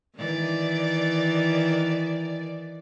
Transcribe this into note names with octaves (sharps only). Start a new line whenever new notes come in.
D#3 E3 D5